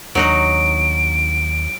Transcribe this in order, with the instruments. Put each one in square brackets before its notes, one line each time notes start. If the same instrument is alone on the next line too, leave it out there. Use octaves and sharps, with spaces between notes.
[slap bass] D#2 D4 [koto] F#3 D#4 F#4 [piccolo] D7